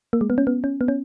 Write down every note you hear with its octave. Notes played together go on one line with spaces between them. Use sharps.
A#3
G#3
B3
C#4
B3
C#4
B3
C#4